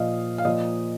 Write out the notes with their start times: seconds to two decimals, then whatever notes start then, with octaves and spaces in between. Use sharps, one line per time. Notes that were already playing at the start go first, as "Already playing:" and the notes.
Already playing: A#2 F3 D#5 F5
0.38 F5
0.45 A#2 F3 D#5